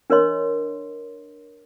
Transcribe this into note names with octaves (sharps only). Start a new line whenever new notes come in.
D4 A#4 C#5 D#5 C6